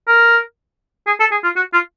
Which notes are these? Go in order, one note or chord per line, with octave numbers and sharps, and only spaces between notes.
A#4
G#4
A4
G#4
F4
F#4
F4